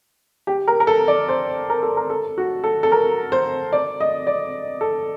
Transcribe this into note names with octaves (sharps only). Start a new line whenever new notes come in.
G4
A#4
A#4
A4
D5
C5
A#4
A4
A#4
A4
F#4
A4
A4
A#4
C5
D5
D#5
D5
A4